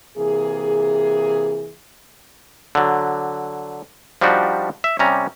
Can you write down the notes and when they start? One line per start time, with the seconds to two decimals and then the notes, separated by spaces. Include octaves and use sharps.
0.18 C3 E3 A#3 G#4
2.75 D3 F#3
4.21 F3 G3 D4 D#4 F#4 G4
4.84 E5
4.99 C3 G3 C#4 A#5